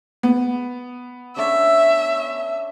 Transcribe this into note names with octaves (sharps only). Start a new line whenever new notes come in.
B3
A3 C#4 D4 E5